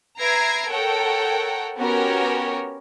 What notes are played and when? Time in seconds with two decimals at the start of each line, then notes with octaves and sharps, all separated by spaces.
0.19 B4 E5 A#5 G#6 C7 D7
0.68 A4 A#4 C#5 F#5 G5
1.78 B3 C#4 F#4 G4 A#4 C#5